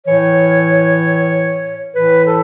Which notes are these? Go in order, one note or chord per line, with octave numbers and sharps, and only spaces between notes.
A2 E3 C#5
A2 E3 B4
A4